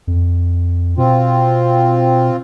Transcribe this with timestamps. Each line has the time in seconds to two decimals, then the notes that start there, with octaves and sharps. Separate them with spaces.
0.07 F2
0.98 B2 C4 F4